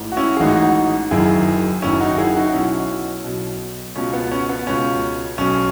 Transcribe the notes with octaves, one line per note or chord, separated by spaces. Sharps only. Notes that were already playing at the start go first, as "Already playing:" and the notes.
Already playing: A1 G#2 E3
F#4
C#4 E4
G#4
A1 G#2 E3 D#4 F#4
F#1 F#2 D#3 E4 G#4
F#1 F#2 D#3 C#4 E4
D#4 F#4
E4 G#4
D#4 F#4
B1 B2 C#4 E4
B1 B2
C#2 B2 C#4
B3
C#4
B3
C#2 B2 C#4
B1 B2 C#4